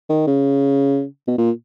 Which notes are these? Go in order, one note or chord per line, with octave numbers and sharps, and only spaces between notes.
D#3
C#3
B2
A#2